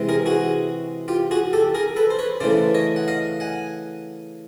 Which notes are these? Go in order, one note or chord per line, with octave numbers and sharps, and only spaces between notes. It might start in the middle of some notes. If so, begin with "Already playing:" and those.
Already playing: C3 E3 G#3
G#4 A#4
F#4 G#4
F4 G4
F#4 G#4
G4 A4
G#4 A#4
A4 B4
C5
B4 C#5
C#3 E3 A3 C5 D5
C#5 D#5
F#5
D#5 F5
F#5 G#5